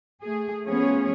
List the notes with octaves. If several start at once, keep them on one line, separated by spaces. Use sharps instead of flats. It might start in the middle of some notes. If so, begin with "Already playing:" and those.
A3 G#4
F3 A3 B3 C#4 G#4 C#5